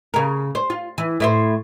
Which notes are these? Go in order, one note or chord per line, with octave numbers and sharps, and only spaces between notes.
C#3 A#4
C5
F4
E3
A2 E4 C5